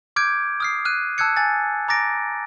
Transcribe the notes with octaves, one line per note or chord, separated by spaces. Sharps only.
D6 F6 G6 G#6 D7
D#6 F6 C7
F6 F#6 D#7
A5 E6 F#6 G#6 C#7
G#5 A6
A#5 D6 A6 A#6 D7